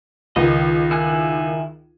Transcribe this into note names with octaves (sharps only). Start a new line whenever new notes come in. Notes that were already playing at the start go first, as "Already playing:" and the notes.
C#2 D#3 D#5
E4 G#5 F#6